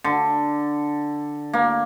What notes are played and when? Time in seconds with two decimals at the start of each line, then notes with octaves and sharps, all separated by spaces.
0.04 D3
1.53 A#3